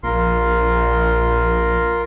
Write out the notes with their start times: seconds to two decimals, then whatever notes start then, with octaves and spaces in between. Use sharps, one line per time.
0.03 A#1 F4 A#4 C6